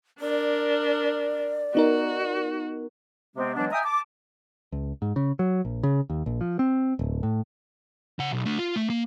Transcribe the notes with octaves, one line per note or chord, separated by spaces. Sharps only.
D4 A#4 D5
B3 D#4 F#4 A#4
C3 G#3 B3 C4
E3 F#3 G#3 B3 D4
D#5 E5 G5 G#5 A#5 D#6
A5 D6
C#2
G#2
C#3
F#3
A#1
C#3
D#2
A#1
F3
C4
D1
A2
C#3 F#5
B1
A3 D4
F4
A3
A#3